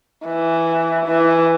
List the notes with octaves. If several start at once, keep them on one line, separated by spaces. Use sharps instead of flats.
E3
E3